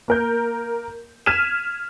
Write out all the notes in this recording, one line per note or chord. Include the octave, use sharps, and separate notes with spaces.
A#3 A#4 G6
F6 G#6 B6 D#7 E7